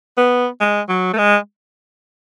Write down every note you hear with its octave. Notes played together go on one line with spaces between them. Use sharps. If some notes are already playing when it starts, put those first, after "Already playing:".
B3
G#3
F#3
A3
G#3